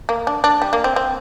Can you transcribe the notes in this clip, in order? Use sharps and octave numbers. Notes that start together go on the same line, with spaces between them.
A#3
D4
D4
G3
A#3
C4
C4